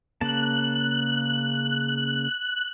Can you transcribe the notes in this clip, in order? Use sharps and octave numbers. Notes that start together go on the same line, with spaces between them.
C#3 A#3 A5 F#6